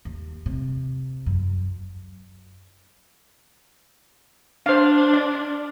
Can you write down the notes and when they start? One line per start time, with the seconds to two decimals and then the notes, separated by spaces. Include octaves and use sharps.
0.05 D#2
0.46 C3
1.26 F#2
4.66 D4 C5 F5
5.13 D5